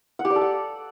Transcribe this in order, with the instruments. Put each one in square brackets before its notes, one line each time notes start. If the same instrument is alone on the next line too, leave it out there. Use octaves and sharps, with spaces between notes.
[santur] F#5
G4
D5
A4
F#5